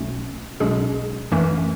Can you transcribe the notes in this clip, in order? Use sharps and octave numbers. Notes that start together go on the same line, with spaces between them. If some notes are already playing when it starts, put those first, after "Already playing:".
Already playing: B1 B2 A3 C#4
B1 B2 G#3 C#4 G#4
F#2 E3 A3 C#4